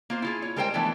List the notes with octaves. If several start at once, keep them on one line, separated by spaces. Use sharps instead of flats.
A#3 F4 C5
E4 F4 G#4
C#5
G3 G#3 A#4 C5 E5 G5
E3 F3 A3 B3 D4